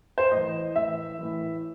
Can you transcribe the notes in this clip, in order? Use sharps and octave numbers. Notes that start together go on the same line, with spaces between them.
C5
A2 E3 D#5
A2 E3 E5
A2 E3